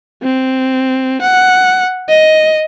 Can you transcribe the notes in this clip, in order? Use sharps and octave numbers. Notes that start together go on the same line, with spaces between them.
C4
F#5
D#5